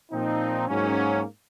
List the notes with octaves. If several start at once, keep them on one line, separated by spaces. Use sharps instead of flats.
A#2 F3 C4 D#4
G#2 F#3 A#3 C#4